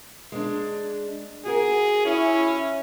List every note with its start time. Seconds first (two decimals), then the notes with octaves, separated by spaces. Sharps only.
0.32 G#3 D4
1.46 F#4 G#4 A#4
2.06 C#4 E4